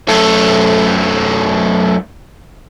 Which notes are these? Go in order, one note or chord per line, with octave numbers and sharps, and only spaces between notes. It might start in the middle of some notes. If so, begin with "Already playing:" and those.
F#2 A3